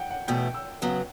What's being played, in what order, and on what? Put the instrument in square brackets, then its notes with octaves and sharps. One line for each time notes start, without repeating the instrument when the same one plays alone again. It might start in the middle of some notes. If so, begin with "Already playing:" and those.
Already playing: [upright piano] F#5 G5
F#5
[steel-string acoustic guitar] E2 B2 A3 E4 [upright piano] G5
[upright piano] E6
[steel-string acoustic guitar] C#3 F#3 B3